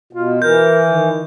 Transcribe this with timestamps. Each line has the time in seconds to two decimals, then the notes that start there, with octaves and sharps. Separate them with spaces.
0.13 B2 F4
0.42 E3 A#4 G6
0.87 D#3